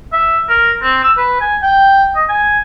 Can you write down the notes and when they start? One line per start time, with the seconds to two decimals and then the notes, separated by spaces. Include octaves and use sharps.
0.12 E5
0.49 A#4
0.82 C4
1.03 E6
1.17 B4
1.41 G#5
1.63 G5
2.15 D#5
2.29 G#5